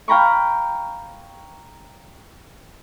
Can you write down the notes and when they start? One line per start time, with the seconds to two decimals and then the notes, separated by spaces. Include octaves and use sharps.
0.08 F5 G5 A#5 B5 C#6